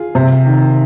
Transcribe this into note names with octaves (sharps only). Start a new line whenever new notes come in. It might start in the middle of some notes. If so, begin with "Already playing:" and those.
Already playing: F4 G#4
C3
D#3